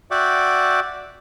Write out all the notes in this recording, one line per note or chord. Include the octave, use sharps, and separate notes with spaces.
F#4 D5 E5 F#5 G5 D6